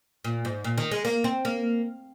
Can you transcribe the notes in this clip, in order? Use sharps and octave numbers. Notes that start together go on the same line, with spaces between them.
A#2
G#2
A#2
D#3
G#3
A#3
C4
A#3